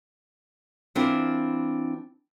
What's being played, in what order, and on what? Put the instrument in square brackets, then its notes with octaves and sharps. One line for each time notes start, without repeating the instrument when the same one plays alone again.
[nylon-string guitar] E3 C4 D4 E4 F4 A#4